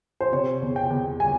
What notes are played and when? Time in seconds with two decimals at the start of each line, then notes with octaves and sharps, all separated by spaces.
0.21 C5
0.32 C3 C#5
0.62 E2
0.76 G5
0.90 E2
1.20 G3 G#5